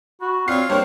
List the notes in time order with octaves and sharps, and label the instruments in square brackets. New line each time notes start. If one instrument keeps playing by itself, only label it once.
[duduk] F#4 [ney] B5
[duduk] C4 [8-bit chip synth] F4 C#5 [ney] D5 [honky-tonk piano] F6 C7
[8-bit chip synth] G3 A#3 [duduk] D4 [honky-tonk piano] C5 C#5 [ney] G5